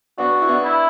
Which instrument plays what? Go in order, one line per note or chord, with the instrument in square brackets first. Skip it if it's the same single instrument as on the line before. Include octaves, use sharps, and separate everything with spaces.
[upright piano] B3 D4 [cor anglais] F#4
[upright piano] E4
B3 D4
[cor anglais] E4